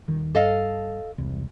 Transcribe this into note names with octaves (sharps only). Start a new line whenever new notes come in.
D#1 D#3
G2 A4 D#5 F5
E1 C2